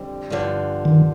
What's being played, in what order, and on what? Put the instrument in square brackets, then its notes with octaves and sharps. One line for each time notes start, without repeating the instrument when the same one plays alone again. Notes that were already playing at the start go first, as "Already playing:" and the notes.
Already playing: [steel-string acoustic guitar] F2 D3 G3 C4
G2 D3 F3
[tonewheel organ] D#3